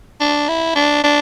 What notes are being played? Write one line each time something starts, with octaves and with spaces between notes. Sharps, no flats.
D4
E4
D4
D4